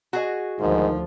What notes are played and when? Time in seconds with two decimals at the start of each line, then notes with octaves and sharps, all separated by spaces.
0.13 F#4 G#4 D#5
0.60 D2 G#2 D#3 F3